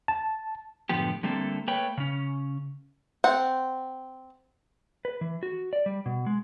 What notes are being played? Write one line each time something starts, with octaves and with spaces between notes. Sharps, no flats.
A5
F#2 A2 D3 F3 B3 G4
D3 G3 A3 A#3 C4 A4
A3 A#3 B4 C#5 G5
C#3 C#4
C4 F#5
B4
E3
F#4
D5
G3
B2
G#3